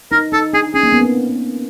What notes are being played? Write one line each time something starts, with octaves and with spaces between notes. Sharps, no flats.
D#4 A#4
D#4 A4
D4 G#4
C#4 G#4
A#3
B3
C4
B3